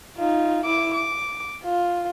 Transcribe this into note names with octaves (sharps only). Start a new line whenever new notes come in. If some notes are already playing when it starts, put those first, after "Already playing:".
D#4 F4
E4 D6
D6
F4